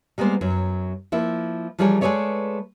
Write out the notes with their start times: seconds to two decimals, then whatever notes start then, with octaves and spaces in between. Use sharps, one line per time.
0.18 G3 G#3 A#3 B3 C5
0.41 F#2 F#3
1.12 F3 A#3 E4
1.79 E3 F3 G3 G#4 A#4 C#5
2.01 G#3 A3 G#4 B4 C#5 D5